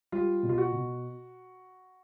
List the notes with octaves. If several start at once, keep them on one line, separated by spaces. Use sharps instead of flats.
G3 F4
B2
F4
F#4
B2